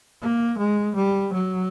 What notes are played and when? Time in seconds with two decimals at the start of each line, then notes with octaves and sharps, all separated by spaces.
0.22 A#3
0.58 G#3
0.96 G3
1.33 F#3